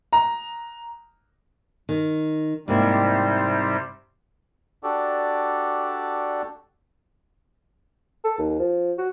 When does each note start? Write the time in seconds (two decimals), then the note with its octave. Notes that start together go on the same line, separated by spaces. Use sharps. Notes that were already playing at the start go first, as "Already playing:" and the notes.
0.13 A#5
1.89 D#3
2.68 G#2 C3 G3 A#3 C4 E4
4.83 D4 F#4 G4 A4 D5
8.24 A4
8.38 D#2
8.59 F3
8.98 F#4